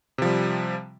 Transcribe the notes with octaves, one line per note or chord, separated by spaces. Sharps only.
C3 F3 G3